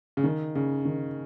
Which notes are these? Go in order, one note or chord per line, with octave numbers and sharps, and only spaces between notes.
C#3
D#3
C#3
D#3